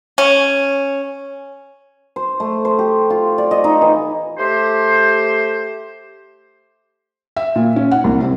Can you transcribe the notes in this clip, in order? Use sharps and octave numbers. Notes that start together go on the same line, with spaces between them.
C#4
C5
A3
C5
G4
F4
D5
D#5
D#4
E3
A3 G4 C5
E5
A#2
C#4
F#5
C2
C3